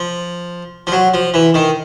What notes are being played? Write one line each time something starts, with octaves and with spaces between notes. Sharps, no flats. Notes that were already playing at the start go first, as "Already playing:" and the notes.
Already playing: F3
F3
F#3
F3
E3
D#3